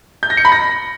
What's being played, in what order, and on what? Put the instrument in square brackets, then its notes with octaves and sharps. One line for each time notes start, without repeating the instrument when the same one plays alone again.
[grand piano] G6
A#6
C#7
B5
A#6